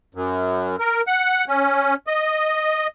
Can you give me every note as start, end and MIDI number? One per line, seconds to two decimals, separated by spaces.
0.15 0.76 42
0.79 1.01 70
1.07 1.44 78
1.48 1.94 61
2.07 2.87 75